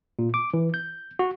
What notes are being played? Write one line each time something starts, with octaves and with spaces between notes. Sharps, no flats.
A#2
D6
E3
G6
F#4